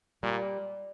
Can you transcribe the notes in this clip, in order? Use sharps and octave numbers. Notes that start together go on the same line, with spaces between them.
A#2 G3